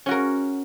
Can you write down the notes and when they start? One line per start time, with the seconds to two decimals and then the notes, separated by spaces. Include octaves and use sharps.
0.06 C#4
0.09 F#4
0.11 A#4